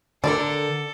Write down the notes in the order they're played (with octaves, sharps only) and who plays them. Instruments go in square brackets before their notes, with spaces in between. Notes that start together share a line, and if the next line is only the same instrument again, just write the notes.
[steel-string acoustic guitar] D3 A#4 [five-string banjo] D4 D5 [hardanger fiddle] A4